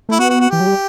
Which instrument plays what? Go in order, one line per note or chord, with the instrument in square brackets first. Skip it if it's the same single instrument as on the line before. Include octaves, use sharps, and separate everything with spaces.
[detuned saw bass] A3 [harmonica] E4
[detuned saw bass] B3 [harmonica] F#4
[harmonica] F#4
F#4
[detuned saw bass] E3 [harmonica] G4
[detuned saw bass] F#3
G3